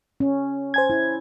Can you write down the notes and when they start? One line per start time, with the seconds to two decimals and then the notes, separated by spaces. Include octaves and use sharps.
0.20 C#4
0.74 C5 G#5 G#6
0.90 E4